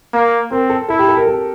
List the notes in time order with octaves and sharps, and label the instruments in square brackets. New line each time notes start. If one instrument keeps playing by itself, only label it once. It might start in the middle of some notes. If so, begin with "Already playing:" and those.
[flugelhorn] A#3
[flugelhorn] C4 [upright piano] A#4
[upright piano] A4
[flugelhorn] E4 [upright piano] A4
[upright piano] G4
A4
A#4
A4